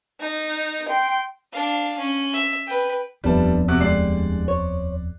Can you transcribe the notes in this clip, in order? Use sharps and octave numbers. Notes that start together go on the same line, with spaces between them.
D#4
G5 C6
D4 F5
C#4
E5
B4 G5
D#1 F2 G3 B3 D4 B4 E5 A5
C3 F#4 F#6
D3 G3 G#3 D5 C7
C5 C#5